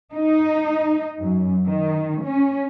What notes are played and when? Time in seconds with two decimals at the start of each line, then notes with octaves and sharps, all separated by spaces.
0.14 D#4
1.20 F#2
1.67 D#3
2.23 C#4